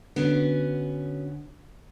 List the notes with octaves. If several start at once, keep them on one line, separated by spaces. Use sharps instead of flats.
D3 B3 C#4 F#4